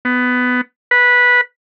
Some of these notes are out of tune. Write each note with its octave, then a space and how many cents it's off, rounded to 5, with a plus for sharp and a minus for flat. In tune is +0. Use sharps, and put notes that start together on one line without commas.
B3 +15
B4 -10